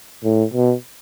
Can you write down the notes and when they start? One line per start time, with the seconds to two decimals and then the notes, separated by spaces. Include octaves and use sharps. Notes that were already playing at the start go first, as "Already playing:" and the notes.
0.24 A2
0.54 B2